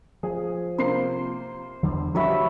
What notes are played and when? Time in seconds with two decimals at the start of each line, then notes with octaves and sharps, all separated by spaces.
0.23 F3 G#4
0.78 C3 A#3 C5 C7
1.83 E2 D3 G3
2.15 F3 G3 A3 F#4 G4 B4 C#5 E5